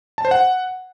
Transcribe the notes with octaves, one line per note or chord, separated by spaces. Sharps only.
A5
C5
F#5